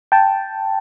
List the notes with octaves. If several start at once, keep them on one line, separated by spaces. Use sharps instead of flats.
G5 A5